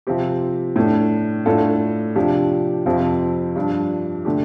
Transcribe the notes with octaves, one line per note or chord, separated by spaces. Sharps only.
C3 F3 C4 G4
A2 A3 D4
A2 A3 D4 F4 A4
C3 F3 D4 G4
F2 C3 F3 C4 F4
G2 F3 D4
D3 A3 D4 G4